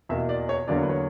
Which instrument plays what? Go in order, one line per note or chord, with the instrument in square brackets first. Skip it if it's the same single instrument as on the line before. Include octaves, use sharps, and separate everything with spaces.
[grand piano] E2 B2 A#3 E5
D5
C#5
E2 D3 F#3 A#3 D5
C#5
B4
C#5